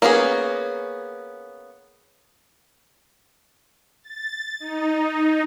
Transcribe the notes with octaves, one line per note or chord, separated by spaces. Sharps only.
A#3 B3 C#4 F#4 G#4
A6
D#4